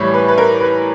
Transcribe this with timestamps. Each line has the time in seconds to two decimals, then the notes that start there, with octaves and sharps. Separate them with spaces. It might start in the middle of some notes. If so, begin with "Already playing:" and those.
Already playing: A2 E3 G3 C#5
0.14 B4
0.28 B4
0.38 A#4
0.61 B4